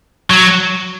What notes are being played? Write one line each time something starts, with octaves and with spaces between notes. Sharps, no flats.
F#3